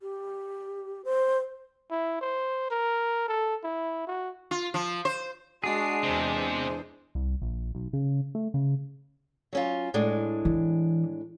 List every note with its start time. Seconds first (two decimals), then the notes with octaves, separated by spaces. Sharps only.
0.02 G4
1.05 C5
1.91 E4
2.21 C5
2.70 A#4
3.28 A4
3.63 E4
4.07 F#4
4.51 F4
4.74 F3
5.05 C5
5.64 G#3 D4 F#4 G#4 C7
6.03 E2 C3 C5
7.15 C2
7.42 A#1
7.75 B1
7.93 C#3
8.35 A3
8.54 C#3
9.53 F#3 C#4 F4
9.94 A2 G#3 D4
10.45 E3